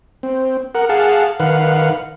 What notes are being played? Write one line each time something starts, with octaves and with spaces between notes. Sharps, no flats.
C4
A#4 F#5
G#4 F5 F#5 A5
D#3 B4 F5 F#5